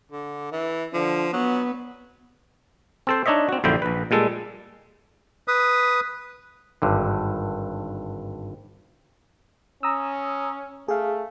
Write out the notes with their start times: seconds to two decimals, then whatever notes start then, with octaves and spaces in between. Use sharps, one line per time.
0.12 D3
0.51 E3
0.94 D3 F3
1.33 F#3 B3
3.07 C4 A4 C5
3.26 D4 D#4 C#5 D#5 E5
3.49 C4 F#4
3.64 A#1 F#2 D3 E4 C5 G5
3.82 A#1 B4
4.11 A#2 G3 G#3 A4
5.48 B4 D#6
6.82 G#1 G2 D3
9.83 C#4 A#5 D#6 E6
10.88 A3 G#4 F5